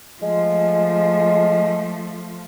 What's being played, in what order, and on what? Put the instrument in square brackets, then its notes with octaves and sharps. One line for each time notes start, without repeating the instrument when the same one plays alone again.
[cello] F3 A3 [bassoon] G#3